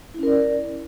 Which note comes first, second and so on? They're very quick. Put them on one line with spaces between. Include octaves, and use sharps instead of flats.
E4 C#4 A#4 D5